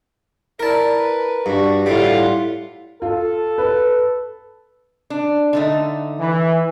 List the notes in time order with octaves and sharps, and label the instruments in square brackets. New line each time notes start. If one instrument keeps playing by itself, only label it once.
[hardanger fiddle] E4 D5 [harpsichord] A#4 A5
[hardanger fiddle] B4
[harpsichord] G2 [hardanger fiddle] D4 F#4
[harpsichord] A2 G3 [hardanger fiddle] F4 F#5
[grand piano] F4 [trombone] A4
[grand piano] B4
[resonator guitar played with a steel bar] D4
D3 A3 D#4
[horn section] E3